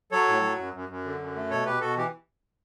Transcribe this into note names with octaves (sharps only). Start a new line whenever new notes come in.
F#3 A4 C#5
A2
F#3
F#2
F#2
F#2
D3
F#2
A3
B2 A4 C#5
B2 G4 B4
B2 F#4 A4
E3 G4